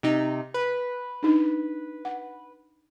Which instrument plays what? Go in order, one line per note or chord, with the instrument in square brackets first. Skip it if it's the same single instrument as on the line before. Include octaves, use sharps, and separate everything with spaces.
[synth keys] C3 D#4
B4
[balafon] D4 D#4
F#5